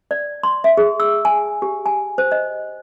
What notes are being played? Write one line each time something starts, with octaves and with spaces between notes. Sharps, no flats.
D5
C6
E5
G#4
E6
G#5
G4
G#5
C5
D#5